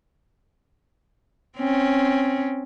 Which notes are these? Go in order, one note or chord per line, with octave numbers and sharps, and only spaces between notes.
C4 C#4